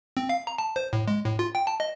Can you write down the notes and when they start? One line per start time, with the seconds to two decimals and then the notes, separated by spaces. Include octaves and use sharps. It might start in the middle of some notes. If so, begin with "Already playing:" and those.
0.17 C4
0.29 F5
0.47 A#5
0.58 A5
0.76 C5
0.93 A2
1.08 G#3
1.25 A2
1.39 F4
1.55 G5
1.67 A5
1.80 D#5